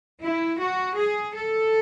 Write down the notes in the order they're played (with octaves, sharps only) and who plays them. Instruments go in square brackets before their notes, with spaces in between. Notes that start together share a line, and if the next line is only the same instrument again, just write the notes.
[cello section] E4
F#4
G#4
A4